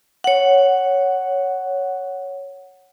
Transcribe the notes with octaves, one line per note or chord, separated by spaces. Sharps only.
C#5 F#5